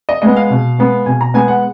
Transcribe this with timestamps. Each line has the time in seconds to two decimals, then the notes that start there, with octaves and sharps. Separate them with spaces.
0.09 D#5
0.22 G#3 B3 D#5
0.36 F5
0.50 B2
0.79 G#3 B3
1.06 B2 G#5
1.21 A#5
1.34 G#3 B3 G#5
1.48 F#5